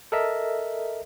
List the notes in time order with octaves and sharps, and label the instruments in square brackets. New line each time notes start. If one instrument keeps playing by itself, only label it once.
[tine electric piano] A4 A#4 D#5 E5